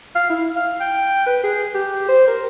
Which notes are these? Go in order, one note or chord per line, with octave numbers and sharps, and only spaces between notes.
F5
E4
F5
G5
B4
G#4
G4
C5
A#4